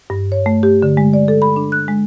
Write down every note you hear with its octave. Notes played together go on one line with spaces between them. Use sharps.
G2
C#5
A3
G4
D3
G#3
D5
A4
B5
D4
F#6
G#3